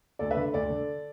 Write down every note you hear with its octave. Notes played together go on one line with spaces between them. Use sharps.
D2 A4 D5
B4 E5
D3
D2 A4 D5
D3